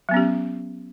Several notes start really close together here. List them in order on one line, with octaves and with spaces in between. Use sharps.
F#3 B3 C#4 G4